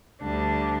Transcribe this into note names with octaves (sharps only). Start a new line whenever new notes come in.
D2 D3 G3 D4